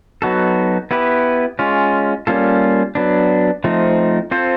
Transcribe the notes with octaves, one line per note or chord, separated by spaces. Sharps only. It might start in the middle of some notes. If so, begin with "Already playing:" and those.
F#3 B3 D#4 F#4 A4
B3 E4 G4 B4
G#3 C#4 F4
G3 A#3 C#4 F4 A4
F#3 B3 D4
F3 A3 C4 D#4
C4 F4 A4 C5